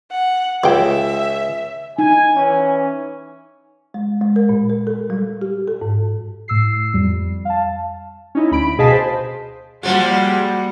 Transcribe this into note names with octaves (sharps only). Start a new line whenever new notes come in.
F#5
C#2 E5 F5 G5
D#4 G#5
E3 C#4
G#3
G#3
A#4
A#2
A#4
A4
G3
G4
A4
G#2
A2 E6 C7
F2 G3
F5 A5
C#4 D#4 E4
D2 B5 D7
B2 G#4 D#5 F5 A5 B6
C5
F3 G3 G#3 A#3 F#4 F#5